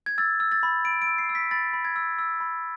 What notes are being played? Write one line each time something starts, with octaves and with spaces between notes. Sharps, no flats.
G#6
E6 A6
E6
A6
B5
B5 D7
D7
E6
C7
E6
B6
B5 A6
B5
G#6
E6
E6
B5